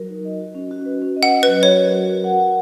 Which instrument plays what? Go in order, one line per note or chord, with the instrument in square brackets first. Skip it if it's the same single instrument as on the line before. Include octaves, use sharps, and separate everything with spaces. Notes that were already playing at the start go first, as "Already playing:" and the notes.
Already playing: [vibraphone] F#3 F#4 A#4
D#4
D#5
F#4
C#4
F#4
B4
C#4
D#5
[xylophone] F#5
[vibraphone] C#4
[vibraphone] F#3 [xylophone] B4
[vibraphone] F#4 [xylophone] C#5
[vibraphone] A#4
F#4
A#4
F#5
F#4